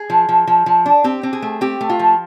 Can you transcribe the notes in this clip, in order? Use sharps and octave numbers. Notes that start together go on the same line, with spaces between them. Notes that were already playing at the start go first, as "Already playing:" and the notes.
Already playing: G#4
F3
F3
F3
F3
D4
C4 G4
C4
G#4
A3
C4 G4
A3
F4
F3